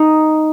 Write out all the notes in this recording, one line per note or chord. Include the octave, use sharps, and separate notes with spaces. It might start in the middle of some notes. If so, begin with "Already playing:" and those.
Already playing: D#4